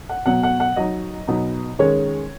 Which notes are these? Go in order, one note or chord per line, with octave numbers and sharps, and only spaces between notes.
F#5
B2 F#3 B3 F#5
F#5
F#5
F#3 D#4 D#5
B2 F#3 B3 D#4
D#3 G#3 C#4 C#5